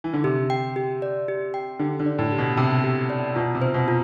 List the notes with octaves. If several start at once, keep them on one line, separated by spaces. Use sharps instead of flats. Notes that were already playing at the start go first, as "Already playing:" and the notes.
E3
D3
C3 G4
G5
G4
D5
G4
G5
D3 G4
D3
D5
A2
G4
B2
C3 G5
G4
D5
B2 F4
C3
C5
B2
F4